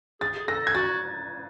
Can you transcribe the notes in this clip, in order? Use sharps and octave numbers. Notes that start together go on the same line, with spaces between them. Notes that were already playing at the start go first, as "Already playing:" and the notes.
G#4 A6
G#4
A4 A#6
G#6
F#4 A6